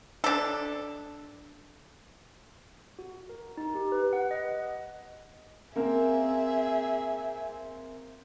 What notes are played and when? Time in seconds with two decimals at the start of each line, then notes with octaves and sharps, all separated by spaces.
0.24 D4 A4
2.99 F#4
3.29 A#4
3.57 D#4
3.75 G4
3.92 B4
4.13 F#5
4.31 D#5
5.76 A#3 C4 G#4 A#4 E5